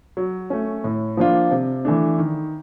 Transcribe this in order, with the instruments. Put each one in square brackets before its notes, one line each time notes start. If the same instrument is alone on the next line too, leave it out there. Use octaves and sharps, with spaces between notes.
[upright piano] F#3
A3 C#4
A2
F3 A#3 D4 F4
C3
E3 A3 D4
D#3